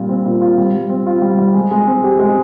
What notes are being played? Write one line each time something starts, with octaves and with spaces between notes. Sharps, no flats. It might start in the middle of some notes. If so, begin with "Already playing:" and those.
Already playing: A#2 G3 F4
C4
A#2
F4
G3
G3
C4
F4
G3
G3
G#3
G#3
C4
G4
G#3